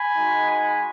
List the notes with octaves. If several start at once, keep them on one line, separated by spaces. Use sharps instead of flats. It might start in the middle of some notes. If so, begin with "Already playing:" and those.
Already playing: G#5 B5
G#3 D#4 F#4
G#5 B5